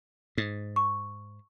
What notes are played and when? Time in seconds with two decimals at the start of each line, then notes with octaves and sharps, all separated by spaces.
0.38 G#2
0.76 C#6